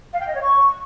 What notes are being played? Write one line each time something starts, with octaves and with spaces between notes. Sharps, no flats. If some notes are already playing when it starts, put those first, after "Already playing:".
F5
G5
D#5
C#5
C#6